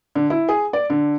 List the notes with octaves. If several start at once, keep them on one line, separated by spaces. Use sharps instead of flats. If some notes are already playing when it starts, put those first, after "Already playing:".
D3
E4
G#4
D5
D3